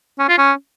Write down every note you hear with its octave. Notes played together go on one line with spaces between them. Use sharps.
C#4
F4
C#4